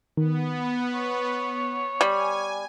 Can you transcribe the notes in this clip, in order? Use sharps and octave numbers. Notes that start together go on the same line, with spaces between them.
D#3 B3
C#5
G3 G#5